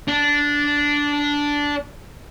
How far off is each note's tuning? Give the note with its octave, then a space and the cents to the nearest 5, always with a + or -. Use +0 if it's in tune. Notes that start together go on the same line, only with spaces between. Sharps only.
D4 -10